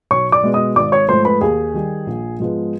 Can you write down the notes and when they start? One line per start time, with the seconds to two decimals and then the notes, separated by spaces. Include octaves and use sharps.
0.11 B1 C#5 C#6
0.32 D5 D6
0.43 B2 G#3 B3
0.54 D#5 D#6
0.75 G#1 D5 D6
0.92 C#5 C#6
1.08 G#2 F3 A3 C5 C6
1.25 B4 B5
1.41 D#2 G#4 G#5
1.74 D#3 G3
2.07 A#1
2.40 G#2 F3 G#3 B3